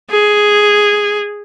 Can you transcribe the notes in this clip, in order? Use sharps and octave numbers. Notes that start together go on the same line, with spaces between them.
G#4